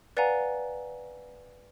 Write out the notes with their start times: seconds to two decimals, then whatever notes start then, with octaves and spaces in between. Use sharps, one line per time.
0.17 B4 D5 F5 F#5 G#5 A#5